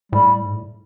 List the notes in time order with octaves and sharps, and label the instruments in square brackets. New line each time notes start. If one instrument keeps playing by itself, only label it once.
[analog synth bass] A2 [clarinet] G3
[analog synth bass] G#2
A2